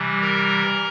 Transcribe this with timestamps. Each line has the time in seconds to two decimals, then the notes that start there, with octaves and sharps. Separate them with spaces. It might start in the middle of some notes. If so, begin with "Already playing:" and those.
Already playing: C3 E3 G3
0.21 A#4 A#5